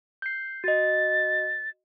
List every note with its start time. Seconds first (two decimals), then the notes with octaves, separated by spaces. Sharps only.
0.22 G6 C7
0.64 F#4 D#5 A6